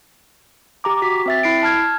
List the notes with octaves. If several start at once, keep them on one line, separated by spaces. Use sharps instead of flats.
G4 A#5 D6
F#4 B6
C4 E5 A6
E4 C7 D7
A5 F6 G#6